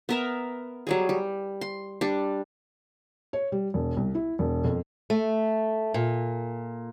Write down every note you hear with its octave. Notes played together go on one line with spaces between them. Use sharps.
B3 A#4 E5
F#3 G3 G#4
G3
C6
G3 D4
C#5
G3
E1
C2
E4
E1
F2
A3
A#2